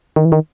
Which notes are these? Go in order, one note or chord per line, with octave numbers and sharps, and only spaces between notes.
D#3
E3
D#3